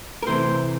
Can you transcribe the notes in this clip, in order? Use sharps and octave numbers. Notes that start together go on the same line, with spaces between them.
A#4
C3 E3 A3 C4 C5